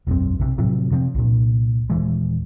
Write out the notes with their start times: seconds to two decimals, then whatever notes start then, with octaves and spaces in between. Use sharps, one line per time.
0.07 E1 B1 F#2 C4
0.39 B1 C3
0.58 A2 C3 F3 F#3
0.91 C3 F3 B3 C4
1.15 C2 A#2
1.90 D#1 E3 G#3